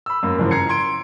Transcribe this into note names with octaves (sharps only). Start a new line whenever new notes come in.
B5 E6
F#2 A#3
F#1 F#2 E3 F3
A#5 G#6 C7 C#7
C6 G#6 D7